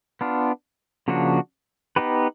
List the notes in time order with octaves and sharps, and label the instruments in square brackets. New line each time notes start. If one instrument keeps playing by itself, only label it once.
[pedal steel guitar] B3 D4 F4
C#3 F3 A#3 D4 F#4
B3 D#4 G4 B4